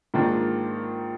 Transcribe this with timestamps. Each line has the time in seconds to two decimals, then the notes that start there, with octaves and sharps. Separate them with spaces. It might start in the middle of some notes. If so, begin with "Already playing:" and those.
0.14 G#2 D#3 A#3 D4 F4